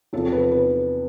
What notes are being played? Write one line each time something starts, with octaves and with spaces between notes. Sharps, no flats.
E2 C3 F3 A4
B4
B4